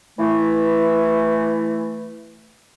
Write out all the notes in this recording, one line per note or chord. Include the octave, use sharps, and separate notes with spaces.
E3 A3